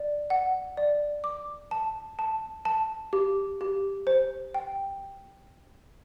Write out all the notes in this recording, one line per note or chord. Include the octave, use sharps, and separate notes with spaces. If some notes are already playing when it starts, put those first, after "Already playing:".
Already playing: D5
F#5
D5
D6
A5
A5
A5
G4
G4
C5
G5